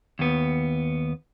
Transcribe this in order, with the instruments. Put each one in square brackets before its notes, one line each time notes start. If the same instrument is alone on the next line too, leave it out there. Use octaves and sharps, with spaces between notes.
[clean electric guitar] D#2 B3